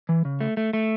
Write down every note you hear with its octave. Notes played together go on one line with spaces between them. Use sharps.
E3
C#3
A3
A3
A3